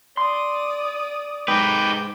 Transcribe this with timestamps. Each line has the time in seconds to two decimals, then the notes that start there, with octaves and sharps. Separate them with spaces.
0.17 D5 C6 D#6
1.48 G#2 D#4 B4 G5 D6